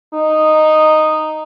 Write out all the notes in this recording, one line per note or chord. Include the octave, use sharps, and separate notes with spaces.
D#4